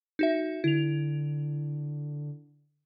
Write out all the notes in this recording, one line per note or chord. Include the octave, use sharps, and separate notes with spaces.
D#4 F#4 E5
D3 E4 F7